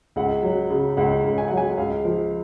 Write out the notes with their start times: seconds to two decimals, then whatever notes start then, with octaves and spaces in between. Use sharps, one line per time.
0.16 C#2 F#5
0.43 F#3
0.70 C#3
0.97 C#2 F#5
1.24 C#2
1.38 G#5
1.48 F#3 F#5
1.57 G#5
1.78 C#2 F5
2.05 F3